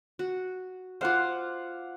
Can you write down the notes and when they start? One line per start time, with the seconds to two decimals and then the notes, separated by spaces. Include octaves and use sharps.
0.19 F#4
1.01 F4 C5 F5 F#5 D6